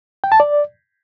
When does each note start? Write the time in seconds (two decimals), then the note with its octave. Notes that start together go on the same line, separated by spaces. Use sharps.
0.24 G5
0.32 A5
0.40 D5